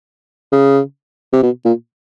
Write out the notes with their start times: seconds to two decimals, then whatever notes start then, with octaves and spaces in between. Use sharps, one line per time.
0.52 C#3
1.33 C3
1.43 B2
1.65 A#2